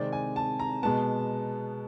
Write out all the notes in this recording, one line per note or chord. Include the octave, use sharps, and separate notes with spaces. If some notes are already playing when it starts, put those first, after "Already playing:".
Already playing: C3 D#3 G#3 C4 D5
G#5
A5
A#5
B2 G#3 B3 A5